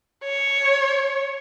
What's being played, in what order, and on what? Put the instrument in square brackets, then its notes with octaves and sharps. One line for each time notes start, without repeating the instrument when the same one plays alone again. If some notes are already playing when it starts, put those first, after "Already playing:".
[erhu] C#5